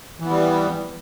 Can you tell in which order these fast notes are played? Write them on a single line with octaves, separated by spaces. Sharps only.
E3 B3 G3